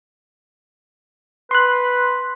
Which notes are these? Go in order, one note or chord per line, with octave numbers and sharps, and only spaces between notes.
B4 C6 F#6